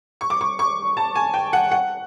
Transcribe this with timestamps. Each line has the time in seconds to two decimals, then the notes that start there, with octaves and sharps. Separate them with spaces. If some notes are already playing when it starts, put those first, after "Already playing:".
0.21 C#6
0.30 D6
0.41 C#6
0.59 C#6
0.97 A5
1.15 G#5
1.34 G5
1.53 F#5
1.71 F#5